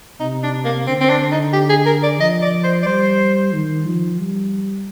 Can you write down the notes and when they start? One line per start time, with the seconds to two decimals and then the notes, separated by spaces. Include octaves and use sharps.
0.20 C3 D#4
0.43 D4
0.65 A#3
0.87 D3 C4
1.01 C4
1.10 D4
1.31 D#4
1.53 G4
1.70 G#4
1.86 A#4
2.03 D5
2.20 F3 D#5
2.42 D5
2.64 C5
2.83 D5
2.86 G3 C5
3.53 D#3
3.86 F3
4.19 G3